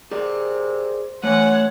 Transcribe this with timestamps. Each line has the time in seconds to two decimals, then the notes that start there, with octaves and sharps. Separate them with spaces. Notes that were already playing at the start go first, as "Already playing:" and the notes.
0.12 C3 G#4 A#4 D5
1.24 F#2 E3 A3 C#5 F#5